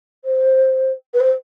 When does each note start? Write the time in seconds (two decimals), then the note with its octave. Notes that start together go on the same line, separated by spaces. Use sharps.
0.24 C5
1.13 B4
1.20 C5